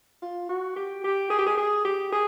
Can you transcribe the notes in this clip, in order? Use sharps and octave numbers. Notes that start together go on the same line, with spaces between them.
F4
F#4
G4
G4
G#4
G4
G#4
G#4
G4
G#4